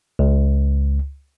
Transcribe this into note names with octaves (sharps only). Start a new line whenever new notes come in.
C#2